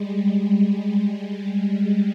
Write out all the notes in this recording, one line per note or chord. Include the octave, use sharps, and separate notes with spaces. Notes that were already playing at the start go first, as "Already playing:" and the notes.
Already playing: G3 G#3
G3